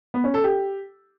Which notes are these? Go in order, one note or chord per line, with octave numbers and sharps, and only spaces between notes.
B3
C#4
A4
G4